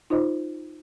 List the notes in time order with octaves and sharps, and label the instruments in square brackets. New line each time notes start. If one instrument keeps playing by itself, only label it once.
[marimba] D#4 F4 C5 D#5